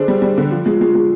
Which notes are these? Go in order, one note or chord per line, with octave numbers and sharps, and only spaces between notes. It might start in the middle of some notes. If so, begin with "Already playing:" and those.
Already playing: D3 D4 G#4 C5
G3
G3
D3
F3 F4
G#3
G#3
G#3